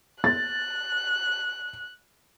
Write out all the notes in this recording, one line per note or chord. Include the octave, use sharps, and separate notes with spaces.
F#6 A6